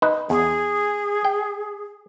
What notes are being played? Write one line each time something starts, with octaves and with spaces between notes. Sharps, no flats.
D#4 B4
E2 G#4
G5